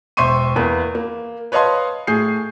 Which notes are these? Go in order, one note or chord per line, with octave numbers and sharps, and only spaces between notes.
E1 C5 E5 C6 C#6 D#7
E2 A#3 B4
A#3
B4 C#5 D#5 F5 A5 C6
A2 G#4 G6 C7